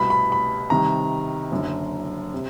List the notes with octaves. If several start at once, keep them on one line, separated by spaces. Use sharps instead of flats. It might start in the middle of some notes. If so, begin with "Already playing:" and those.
Already playing: C2 B2 B5
B5
B5
C2 C3 D#3 A#5
F#1 F#2 D3
C3